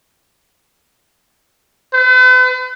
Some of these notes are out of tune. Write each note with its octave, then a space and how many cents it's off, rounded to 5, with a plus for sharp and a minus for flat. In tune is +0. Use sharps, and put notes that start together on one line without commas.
B4 +45